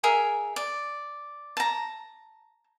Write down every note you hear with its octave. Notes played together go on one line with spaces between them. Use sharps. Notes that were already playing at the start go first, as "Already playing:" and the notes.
G#4 A#4 E5
D5
A5 A#5